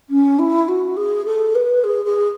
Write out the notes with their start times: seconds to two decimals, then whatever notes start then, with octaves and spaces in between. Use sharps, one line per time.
0.09 C#4
0.38 E4
0.68 F#4
0.96 G#4
1.25 A4
1.55 B4
1.83 G#4
2.05 G#4